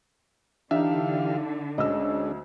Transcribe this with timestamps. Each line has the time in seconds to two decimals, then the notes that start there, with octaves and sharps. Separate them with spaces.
0.71 D3 E3 D4 D#4 G4 E5 F5
1.78 D2 G#3 C#4 D4 D#5 E6